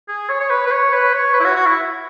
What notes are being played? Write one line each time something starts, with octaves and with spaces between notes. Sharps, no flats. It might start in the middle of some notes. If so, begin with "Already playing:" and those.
G#4
C#5
C#5
B4
B4
C#5
B4
C#5
B4
E4
F#4
F#4
E4